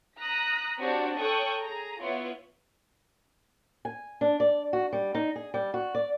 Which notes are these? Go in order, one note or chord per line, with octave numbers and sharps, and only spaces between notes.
A#5 D#6 F#6 A#6 B6
C4 D4 F#4 G4 C#5
A4 C#5 G5 C#6 D#6 F#6
G#4 A#5
B3 E4 F4 C#5
G#5
D4
D5
F#4
G3
D#4
G#4
G3
F#4
D5